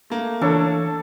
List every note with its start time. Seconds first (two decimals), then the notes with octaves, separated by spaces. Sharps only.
0.10 A3 A#3
0.42 E3 D4 A4 C#5